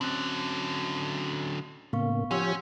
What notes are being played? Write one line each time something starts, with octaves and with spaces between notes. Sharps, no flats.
D3 F#3 C4 C#4 F#6
A2 C#3 A#3 B3 F5 C#6
F3 C#4 G4 C#5 F#5 C6 E6